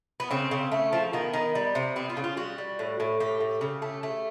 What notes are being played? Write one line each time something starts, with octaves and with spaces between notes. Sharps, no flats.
B3
C#3 C4
C#3
A3
F3
D#3 B3
D#3
G3
C3
B3 C4
F4
C#3
F4
G3 F#4
G3
A2
A2
A2 G4
A2
C#3
A3
A3